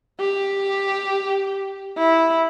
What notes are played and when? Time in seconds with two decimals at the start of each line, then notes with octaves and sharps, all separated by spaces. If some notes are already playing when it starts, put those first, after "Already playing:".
0.20 G4
1.98 E4